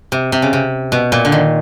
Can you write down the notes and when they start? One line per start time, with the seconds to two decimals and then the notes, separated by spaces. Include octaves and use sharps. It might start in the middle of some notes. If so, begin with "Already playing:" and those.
0.12 C3
0.32 C3
0.42 C#3
0.53 C3
0.92 B2
1.12 A#2
1.25 D3
1.32 D#3